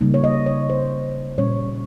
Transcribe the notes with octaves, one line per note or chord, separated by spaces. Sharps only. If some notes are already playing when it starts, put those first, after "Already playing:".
C#3 G3 A#3 D#4
C#5
D#5
C#5
C5
A#2 G3 C#4 C#5